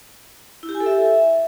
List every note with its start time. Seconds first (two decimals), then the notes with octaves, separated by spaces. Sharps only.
0.63 E4
0.69 G4
0.75 G#5
0.80 A4
0.86 E5